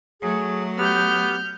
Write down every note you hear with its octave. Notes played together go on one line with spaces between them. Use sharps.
F#3 A3 G#4
B3 G4 F6 G6